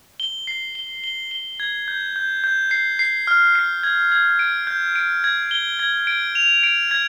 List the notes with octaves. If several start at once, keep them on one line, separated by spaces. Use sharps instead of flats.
G7
C7
G7
G7
G7
G#6
G6
G6
G6
C7
C7
F6
C7
G#6
G#6
D7
G6
D7
G#6
G7
G#6
D7
F7
D7
G#6